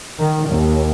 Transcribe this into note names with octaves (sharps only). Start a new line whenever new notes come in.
D#3
D#2